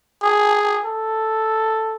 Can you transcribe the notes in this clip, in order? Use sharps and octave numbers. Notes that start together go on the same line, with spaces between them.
G#4
A4